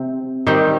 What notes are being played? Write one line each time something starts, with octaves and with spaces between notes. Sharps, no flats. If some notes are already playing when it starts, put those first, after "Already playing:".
Already playing: C3 C4
D#3 G3 C4 G4